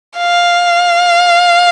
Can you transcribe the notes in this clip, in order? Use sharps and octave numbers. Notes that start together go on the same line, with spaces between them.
F5